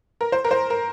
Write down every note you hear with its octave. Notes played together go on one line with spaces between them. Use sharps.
A#4
C5
A#4
C5
A#4